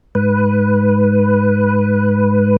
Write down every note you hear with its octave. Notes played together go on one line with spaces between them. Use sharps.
G#2 B4